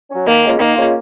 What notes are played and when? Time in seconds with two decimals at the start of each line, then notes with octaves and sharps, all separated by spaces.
0.10 F#3 C#4
0.26 D#3 A#3
0.44 G#3 C#4 F4
0.59 D#3 A#3
0.76 G#3 C#4 F4